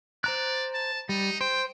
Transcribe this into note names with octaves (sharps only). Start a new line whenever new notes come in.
C5 D5 A#5 F#6
A5
G3 D#4
C5 G5